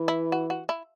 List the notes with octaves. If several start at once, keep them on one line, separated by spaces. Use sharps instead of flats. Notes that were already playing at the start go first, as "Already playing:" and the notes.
Already playing: E3
E4
F#4
F#4
E4